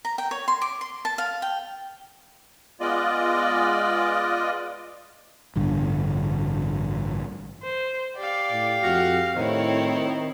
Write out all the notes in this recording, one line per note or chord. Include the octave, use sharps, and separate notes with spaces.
A#5
G5
C#5
C6
D6
C6
A5
F5
G5
G#3 B3 F4 D5 D#5
A1 G2 D3
C5
G4 D5 F5
A2
F2 F#4 F6
A2 D#3 C4 E4 C#5